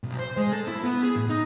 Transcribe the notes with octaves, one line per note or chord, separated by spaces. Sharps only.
B1
C5
G#3
A4
E4
B3
G#4
A2
D#4